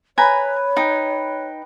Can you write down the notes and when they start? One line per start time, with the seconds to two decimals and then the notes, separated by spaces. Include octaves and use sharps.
0.18 B4 C#5 G#5 A#5 B5
0.77 D#4 G5